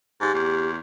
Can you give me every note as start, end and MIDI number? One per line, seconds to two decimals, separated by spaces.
0.21 0.32 44
0.21 0.68 67
0.34 0.77 40